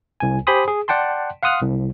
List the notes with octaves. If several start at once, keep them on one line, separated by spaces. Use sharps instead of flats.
C2 G#5
G4 C5 G#5 B5 C6 D#6
G#4
D5 F#5 G5 A5 C6
F5 F#5 C6 D#6 F6 F#6
C2